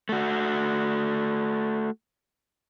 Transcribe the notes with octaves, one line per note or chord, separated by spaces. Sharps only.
A3 F#4